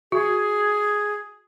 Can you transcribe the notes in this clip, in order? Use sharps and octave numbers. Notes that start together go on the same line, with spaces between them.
F#4 G#4